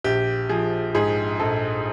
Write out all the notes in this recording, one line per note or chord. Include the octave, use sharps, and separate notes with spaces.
A#1 G4
F3 G#4
G#2 G#4
A#1 A4